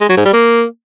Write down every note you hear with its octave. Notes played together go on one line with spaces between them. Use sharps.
G#3
F#3
G#2
G3
A#3